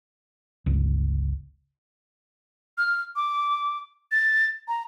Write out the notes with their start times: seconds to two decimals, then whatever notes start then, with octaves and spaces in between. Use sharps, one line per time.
0.66 G1 C#2
2.78 F6
3.16 D6
4.12 A6
4.68 A#5